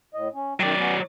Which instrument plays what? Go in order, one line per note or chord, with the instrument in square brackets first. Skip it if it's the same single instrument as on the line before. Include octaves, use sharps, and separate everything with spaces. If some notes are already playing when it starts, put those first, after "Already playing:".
[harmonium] A2 D#5
C#4
[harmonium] F#2 D#3 G5 [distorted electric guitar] F#3 D5
[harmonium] B3 C#4